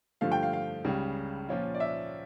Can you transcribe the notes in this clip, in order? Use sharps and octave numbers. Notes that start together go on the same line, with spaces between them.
G2 D3 F3 A3 F5
G5
F5
F5
C#2 C#3 G3
A#2 F3 C#4 F4
D5
E5